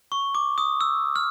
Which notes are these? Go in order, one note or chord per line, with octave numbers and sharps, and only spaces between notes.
C#6
D6
D#6
E6
F6